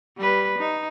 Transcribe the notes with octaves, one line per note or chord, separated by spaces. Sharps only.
G3 B4
D#4